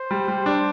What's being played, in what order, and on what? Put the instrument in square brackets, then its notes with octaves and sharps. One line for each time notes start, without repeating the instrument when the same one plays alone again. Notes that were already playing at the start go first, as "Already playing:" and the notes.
Already playing: [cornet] C5
[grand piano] G3
G3
D4